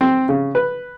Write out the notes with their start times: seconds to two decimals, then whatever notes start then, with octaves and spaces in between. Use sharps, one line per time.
0.01 C4
0.29 C#3
0.55 B4